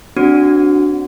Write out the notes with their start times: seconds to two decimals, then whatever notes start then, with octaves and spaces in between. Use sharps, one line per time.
0.17 C4 D4 F#4